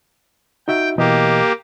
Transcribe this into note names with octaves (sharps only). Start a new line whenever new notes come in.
D#4 F#4 E5 G5
B2 E3 A#3 G4 D#5